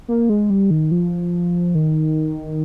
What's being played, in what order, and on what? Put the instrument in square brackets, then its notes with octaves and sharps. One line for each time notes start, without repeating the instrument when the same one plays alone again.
[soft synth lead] A#3
G#3
G3
D#3
F3
D#3